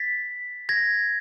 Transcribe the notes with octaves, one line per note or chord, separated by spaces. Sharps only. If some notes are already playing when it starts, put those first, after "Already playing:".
Already playing: A6 B6
G#6 A#6